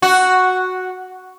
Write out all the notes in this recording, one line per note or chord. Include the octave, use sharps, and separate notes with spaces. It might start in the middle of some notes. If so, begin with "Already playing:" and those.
F#4